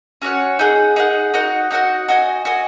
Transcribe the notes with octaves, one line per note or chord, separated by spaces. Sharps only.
C#4 F#4 C#5 F#5
D#4 G#4 F#5
D#4 G#4 F#5
D#4 F#4 D#5 F#5
D#4 F#4 D#5 F#5
F#4 D#5 G#5
F#4 D#5 G#5